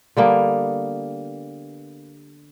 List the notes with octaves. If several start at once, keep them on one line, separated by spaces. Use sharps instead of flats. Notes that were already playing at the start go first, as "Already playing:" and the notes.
D3 G3 A#3 B3